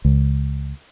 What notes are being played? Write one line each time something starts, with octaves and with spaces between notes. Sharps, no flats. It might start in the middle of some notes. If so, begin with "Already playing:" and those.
C#2